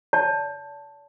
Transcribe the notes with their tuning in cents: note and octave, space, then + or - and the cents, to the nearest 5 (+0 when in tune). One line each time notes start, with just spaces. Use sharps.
D5 -45 A5 +0